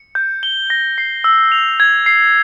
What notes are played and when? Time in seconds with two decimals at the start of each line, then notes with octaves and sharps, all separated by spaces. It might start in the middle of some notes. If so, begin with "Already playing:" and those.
Already playing: C#7
0.15 G6
0.43 G7
0.70 A#6
0.98 C7
1.24 E6
1.52 F7
1.80 G#6
2.06 C7